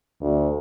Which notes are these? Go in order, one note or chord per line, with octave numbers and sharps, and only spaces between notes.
D2